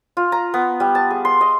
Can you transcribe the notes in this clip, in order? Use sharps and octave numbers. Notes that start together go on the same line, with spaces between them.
F4
A#5
B3
G3
A5
G#4
C6
D#5